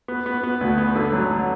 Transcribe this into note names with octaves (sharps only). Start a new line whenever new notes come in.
B3
B3
B3
D2
B3
D3
F#3
F#3